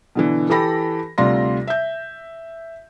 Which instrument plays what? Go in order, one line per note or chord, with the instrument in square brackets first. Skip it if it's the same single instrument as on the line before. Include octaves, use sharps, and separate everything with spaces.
[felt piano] B2 D3 E3
E3 G4 A4 B5 A#6
D2 C3 G3 F4 C6 A#6
E5 G6